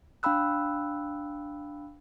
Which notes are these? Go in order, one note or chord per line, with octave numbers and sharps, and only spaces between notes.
D4 F5 G5 B5 E6 F#6